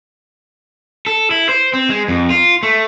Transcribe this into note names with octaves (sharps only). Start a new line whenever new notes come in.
A4
E4
C5
C4
G#3
F2
F4
A3